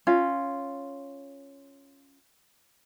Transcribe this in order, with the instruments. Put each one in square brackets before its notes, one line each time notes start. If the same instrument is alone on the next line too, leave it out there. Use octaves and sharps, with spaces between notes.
[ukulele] C#4 F4